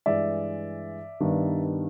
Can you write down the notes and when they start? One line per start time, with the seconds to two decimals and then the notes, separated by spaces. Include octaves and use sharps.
0.06 G2 E3 G#3 D5 E5
1.20 G2 D#3 G3 B3 D4